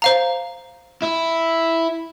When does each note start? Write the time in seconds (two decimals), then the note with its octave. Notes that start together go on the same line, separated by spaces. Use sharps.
0.02 C5 F5 A#5
1.03 E4